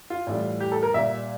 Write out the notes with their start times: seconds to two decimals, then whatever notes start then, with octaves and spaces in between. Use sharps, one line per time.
0.10 F4
0.27 A2 E3 G3
0.60 G4
0.72 A4
0.83 A#4
0.94 A#2 G3 E5